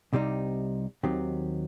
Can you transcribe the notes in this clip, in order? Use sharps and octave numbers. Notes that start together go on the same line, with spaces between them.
C2 C3 G3 C4 D#4
D#2 D#3 F#3 C4 G4